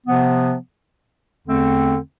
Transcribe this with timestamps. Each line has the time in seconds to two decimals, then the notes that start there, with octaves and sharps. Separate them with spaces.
0.07 C3 F3 B3
1.47 E2 D3 A3 C4